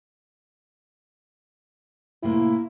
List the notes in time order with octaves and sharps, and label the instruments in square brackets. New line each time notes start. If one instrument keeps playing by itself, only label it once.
[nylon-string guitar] A2 C3 A#3 [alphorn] E4